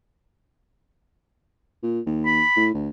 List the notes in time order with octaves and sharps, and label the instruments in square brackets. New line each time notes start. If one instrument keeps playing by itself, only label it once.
[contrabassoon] A#2
D#2
[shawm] B5
[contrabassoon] A2
D2